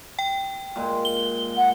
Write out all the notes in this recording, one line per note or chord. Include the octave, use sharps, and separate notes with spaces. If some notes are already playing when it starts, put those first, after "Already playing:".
G5
A#2 G#3
G7
F#5